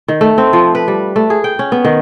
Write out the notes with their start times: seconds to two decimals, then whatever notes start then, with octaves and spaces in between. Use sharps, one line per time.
0.08 D#3
0.21 A3
0.38 C4
0.53 F3
0.75 B4
0.88 G3
1.16 A3
1.30 G#4
1.44 G5
1.59 C#4
1.72 B3
1.85 D#3